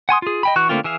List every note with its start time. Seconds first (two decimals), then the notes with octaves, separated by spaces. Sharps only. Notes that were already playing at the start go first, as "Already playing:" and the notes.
0.09 F#5 G#5 C6 D#6
0.22 F4 G#4
0.43 D#5 G5 B5
0.56 E3 F#4 C#6 F#6
0.69 D3 A3 A#3 C4 F4
0.84 E3 G#4 E5 F5